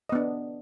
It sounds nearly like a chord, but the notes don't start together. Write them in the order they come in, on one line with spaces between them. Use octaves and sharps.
D#5 B3 D4